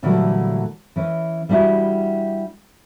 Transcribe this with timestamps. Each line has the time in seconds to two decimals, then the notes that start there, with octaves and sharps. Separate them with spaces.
0.03 A#2 D3 E3 F#3 G3 A3
0.96 E3 C#4
1.49 G3 D4 E4 F#4